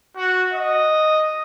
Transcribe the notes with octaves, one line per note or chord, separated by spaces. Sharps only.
F#4
D#5